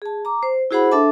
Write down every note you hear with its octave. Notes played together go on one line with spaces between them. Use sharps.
G#4 A5
A#5 D6
C5
E4 F#4 G#4 C5 F#5 B5
D4 A4 E5 A5 D6